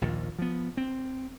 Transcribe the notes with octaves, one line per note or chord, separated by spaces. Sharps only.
A#1 D#2 A#2
F3 B3
C4